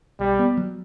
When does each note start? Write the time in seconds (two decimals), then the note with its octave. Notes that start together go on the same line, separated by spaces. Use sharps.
0.19 B1 G3
0.39 B3
0.57 F#3